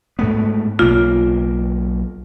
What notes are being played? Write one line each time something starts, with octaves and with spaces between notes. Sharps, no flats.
G#2 A3 B3
B1 A#3 F4